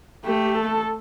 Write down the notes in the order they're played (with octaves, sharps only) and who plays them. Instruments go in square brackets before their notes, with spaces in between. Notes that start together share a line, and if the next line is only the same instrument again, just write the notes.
[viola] A3 [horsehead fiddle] G4
[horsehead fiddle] A4